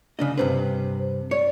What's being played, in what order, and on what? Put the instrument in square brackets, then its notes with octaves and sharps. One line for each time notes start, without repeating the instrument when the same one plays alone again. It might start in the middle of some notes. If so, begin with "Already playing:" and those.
[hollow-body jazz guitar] C#3 D4 D#5
[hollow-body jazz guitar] G2 C3 B4 [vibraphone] C5
[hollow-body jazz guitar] C#5 [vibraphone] D5